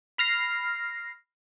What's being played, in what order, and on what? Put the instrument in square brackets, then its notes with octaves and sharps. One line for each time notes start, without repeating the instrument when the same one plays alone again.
[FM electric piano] B5 F6 A#6 C7